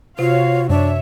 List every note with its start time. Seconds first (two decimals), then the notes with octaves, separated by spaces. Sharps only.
0.19 C3 F4 F#4 C#5 F5
0.70 F#2 D4 C#5 E5